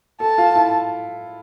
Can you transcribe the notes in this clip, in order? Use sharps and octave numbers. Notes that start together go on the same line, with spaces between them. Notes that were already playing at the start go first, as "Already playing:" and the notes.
A4 A5
F4
E4